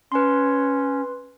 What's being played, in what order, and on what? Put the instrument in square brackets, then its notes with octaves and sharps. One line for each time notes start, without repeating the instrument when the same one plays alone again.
[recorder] C#4 [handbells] B4 C6